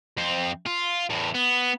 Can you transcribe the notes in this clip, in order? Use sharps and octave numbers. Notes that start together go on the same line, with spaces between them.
F2 C4
F4
E2 A2
B3